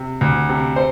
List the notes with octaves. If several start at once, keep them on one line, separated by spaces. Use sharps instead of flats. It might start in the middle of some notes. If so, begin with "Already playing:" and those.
Already playing: C3
D2
C3
C5